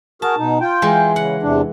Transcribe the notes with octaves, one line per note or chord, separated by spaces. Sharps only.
F#4 G#4 A#4 A5
B2 D#4
F4 G5
E3 G#3
C#3 F#5
E2 C3 D4